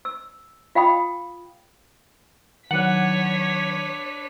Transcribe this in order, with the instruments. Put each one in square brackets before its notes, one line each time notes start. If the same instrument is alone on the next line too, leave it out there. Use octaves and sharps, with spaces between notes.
[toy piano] E6
F4 F5 G5 B5 D#6
[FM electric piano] D#3 F#3 [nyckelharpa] D4 B4 [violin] C#5 B6 [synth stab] F#5